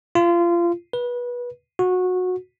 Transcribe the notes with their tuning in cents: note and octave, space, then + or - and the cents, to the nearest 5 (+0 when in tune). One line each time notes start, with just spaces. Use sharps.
F4 -25
B4 -25
F#4 -20